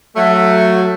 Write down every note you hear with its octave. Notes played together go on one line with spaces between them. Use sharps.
F#3 A3